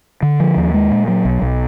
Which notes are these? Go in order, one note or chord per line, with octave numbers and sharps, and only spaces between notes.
D3
F3
D#2
G#3
A#2
F#3
B1
B1